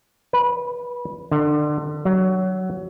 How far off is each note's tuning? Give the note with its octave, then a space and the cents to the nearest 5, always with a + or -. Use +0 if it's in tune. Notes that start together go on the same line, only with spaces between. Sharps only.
B4 -20
D3 +30
F#3 +15